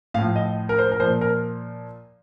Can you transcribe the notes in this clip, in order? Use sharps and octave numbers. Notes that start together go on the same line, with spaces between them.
A2 F3 F5
D#5
A#4
C5
A#4
A#2 F3 C5
A#4